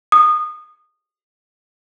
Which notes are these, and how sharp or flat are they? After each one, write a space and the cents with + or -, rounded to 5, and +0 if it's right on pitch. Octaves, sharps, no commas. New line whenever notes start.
D#6 -20